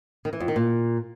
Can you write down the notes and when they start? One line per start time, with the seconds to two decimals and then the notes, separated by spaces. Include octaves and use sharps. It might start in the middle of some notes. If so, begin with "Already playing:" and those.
0.25 D#3
0.33 E3
0.40 F2
0.48 D#3
0.56 A#2